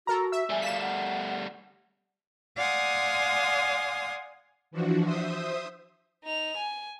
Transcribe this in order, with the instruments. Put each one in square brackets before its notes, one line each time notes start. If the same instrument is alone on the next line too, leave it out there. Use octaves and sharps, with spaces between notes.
[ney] F#4 [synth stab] A4 A#4 A#5
[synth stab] E5
[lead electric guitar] G3 A3 [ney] G#5
[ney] F5 [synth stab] B6 E7
[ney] F#5
[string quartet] D5 F5 F#5 G#5 C6 D#6
[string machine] E3 F3 D4 F#4
C5 E5 D#6
[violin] D#4 F7
G#5